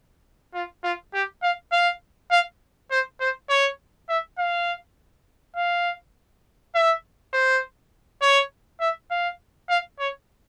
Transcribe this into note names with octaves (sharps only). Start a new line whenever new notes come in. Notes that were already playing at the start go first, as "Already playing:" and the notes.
F4
F4
G4
F5
F5
F5
C5
C5
C#5
E5
F5
F5
E5
C5
C#5
E5
F5
F5
C#5